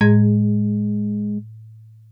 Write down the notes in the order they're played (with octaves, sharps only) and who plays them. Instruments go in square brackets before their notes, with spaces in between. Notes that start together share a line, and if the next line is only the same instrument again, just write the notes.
[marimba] A2 G#6 [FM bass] G#3